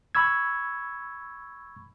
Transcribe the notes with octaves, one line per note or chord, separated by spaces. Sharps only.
B5 C#6 E6 G#6